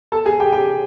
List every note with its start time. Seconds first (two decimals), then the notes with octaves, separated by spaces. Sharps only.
0.12 A4 A5
0.25 G#4 G#5
0.40 G4 G5
0.52 G4 G5